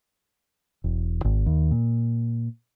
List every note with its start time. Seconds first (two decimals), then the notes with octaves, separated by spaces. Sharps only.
0.84 E1
1.24 G#1
1.46 D#2
1.71 A#2